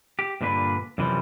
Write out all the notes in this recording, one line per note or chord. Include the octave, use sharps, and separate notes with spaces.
G4
G2 A#2 D3 D4 B4
F#2 C3 E3 F3 G3